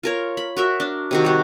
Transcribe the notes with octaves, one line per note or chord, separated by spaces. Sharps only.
F4 A#4 C#5
B5
F#4 A#4 E5
D4
C3 D#3 F#4
G3 F#4